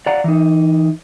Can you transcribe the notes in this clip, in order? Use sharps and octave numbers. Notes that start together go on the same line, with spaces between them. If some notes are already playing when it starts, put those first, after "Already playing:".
D5 F5 F#5 A#5
E3 D#4